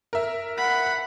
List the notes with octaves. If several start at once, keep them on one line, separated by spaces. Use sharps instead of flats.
A#4 E5
F#5 B5